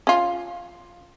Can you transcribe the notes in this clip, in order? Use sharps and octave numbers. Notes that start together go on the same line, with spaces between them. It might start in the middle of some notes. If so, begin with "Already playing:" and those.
C#4 F4